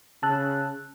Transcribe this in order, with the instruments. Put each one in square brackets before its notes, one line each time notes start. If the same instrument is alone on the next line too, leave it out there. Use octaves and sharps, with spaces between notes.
[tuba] C#3 [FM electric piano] A5 E6 F#6